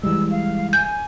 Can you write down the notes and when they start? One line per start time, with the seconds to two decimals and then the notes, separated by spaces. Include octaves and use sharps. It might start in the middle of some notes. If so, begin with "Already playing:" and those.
0.03 E3 G3 G#3 E6
0.31 F5
0.73 G#5 G6